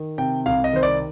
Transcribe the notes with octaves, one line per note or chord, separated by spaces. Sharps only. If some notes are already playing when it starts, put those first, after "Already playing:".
Already playing: D#3
C3 G5
C2 F5
D#5
D#3 C5
D5